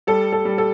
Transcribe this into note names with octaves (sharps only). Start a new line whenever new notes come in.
G3 A4
A4
G3
A4